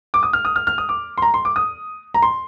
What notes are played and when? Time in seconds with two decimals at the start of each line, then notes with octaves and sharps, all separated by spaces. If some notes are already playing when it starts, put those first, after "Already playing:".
0.14 D6
0.23 D#6
0.33 F6
0.45 D#6
0.56 F6
0.67 F6
0.78 D#6
0.89 D6
1.18 C6
1.22 A#5
1.34 C6
1.45 D6
1.56 D#6
2.14 A#5
2.22 C6